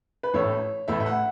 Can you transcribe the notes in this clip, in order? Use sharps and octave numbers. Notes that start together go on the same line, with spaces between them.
B4
A1 A2 A3 E4 C#5
A1 A2 A3 E4 E5
E5
F#5